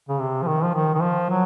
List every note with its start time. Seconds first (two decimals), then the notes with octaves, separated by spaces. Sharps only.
0.09 C#3
0.19 C3
0.43 F3
0.47 D#3
0.64 F3
0.74 D#3
0.94 D#3
1.02 F3
1.30 F#3